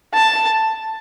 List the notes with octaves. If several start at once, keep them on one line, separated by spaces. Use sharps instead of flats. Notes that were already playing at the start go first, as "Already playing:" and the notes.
A5